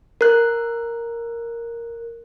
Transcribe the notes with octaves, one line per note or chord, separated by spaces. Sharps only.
A#4 F#6